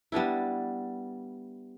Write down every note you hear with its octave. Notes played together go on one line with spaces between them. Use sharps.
G3 B3 D4 E4